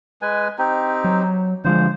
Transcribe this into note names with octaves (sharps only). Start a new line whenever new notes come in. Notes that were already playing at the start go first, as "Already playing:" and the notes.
G#3 B4 G#5
C4 D#4 G4
F#3
D3 F3 G#3 C5